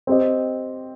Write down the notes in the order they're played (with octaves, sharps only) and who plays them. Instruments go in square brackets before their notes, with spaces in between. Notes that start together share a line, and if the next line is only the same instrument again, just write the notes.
[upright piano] C4 G4 C5 D#5